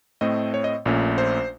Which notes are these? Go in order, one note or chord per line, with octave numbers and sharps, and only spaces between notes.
A2 A3 C4 D#5
C#5
D#5
A#1 A#2 A3 C#4
C5